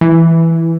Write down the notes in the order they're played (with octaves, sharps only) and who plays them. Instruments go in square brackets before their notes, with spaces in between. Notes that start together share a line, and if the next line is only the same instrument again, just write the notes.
[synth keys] E3